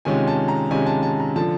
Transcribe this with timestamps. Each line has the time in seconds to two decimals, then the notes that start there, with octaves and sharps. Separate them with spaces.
0.05 C3 D#3 G#3 C#4 F4 G#5
0.28 A5
0.48 A#5
0.70 C3 D#3 G#3 C#4 F4 G#5
0.86 A5
1.03 A5
1.20 A#5
1.36 D3 F3 A5